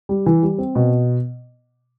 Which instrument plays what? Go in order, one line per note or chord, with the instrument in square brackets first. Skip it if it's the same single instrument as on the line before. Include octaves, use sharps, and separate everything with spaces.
[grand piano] G3
E3
G3
C4
B2